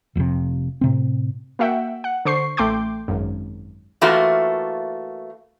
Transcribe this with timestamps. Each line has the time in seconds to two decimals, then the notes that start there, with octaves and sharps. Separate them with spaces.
0.15 F1 F2 A2 C3
0.81 A2 C3 C4
1.59 A#3 F#4 E5 F#5 G5
2.04 F#5
2.25 D3 C5 C#6 C7
2.57 A1 A3 G5 C6 D6 G6
3.08 G#1 F#2
4.01 E3 A3 A#3 F4 F#4